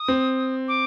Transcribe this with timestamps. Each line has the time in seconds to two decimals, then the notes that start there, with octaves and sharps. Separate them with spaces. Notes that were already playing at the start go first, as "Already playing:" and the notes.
Already playing: D#6
0.08 C4
0.68 D6